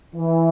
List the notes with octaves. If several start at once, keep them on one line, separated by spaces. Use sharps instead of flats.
E3